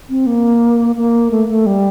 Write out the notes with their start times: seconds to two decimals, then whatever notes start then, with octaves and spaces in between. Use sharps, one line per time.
0.09 C4
0.26 A#3
0.96 A#3
1.31 A3
1.48 A3
1.66 G3